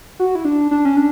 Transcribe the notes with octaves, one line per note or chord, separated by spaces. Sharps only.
F#4
E4
D4
D4
C#4
D4